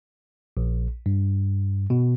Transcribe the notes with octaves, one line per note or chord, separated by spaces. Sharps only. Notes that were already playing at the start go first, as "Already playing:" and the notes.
A#1
G2
B2